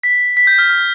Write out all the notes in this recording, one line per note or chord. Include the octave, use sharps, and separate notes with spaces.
B6
B6
G6
F6
F6